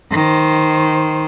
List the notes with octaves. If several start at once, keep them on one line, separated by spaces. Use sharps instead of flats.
D#3 C5